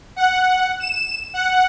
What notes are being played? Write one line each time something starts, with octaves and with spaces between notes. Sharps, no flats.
F#5
E7
F#5